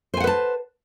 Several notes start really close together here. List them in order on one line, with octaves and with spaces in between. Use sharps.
C5 G#5 F#5 B4 A5